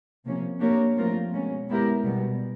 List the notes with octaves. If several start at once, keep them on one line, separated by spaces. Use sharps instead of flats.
C3 F3 A#3 C#4
A#3 D4 G4 A#4 C#5
F3 A3 C4 F4 A#4
B2 G#3 C#4
G#3 B3 E4 G4 A#4
B2 G3 B3